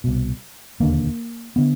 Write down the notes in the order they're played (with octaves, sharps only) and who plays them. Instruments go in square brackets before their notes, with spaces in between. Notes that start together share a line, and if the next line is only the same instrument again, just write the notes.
[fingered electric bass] C2 B2
E1 D#2 D3 A#3
D3 B3